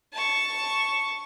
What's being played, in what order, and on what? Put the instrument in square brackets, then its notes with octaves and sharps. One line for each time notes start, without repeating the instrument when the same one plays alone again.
[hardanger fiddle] A5 C#6